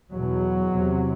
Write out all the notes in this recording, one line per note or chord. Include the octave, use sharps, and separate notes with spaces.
E2 B2 F#3
E2 C3